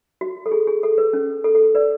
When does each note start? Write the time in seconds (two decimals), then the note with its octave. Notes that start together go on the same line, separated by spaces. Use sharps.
0.21 F#4
0.46 A4
0.52 G#4
0.67 G#4
0.83 A4
0.98 B4
1.13 C#4
1.44 A4
1.55 A4
1.75 B4 D5